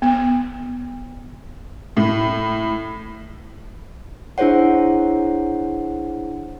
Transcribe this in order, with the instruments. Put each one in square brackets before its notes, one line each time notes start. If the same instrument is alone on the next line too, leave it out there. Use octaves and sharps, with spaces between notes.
[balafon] B3
[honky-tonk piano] A2
[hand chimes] D4 E4 G#4 C5 C#5 F#5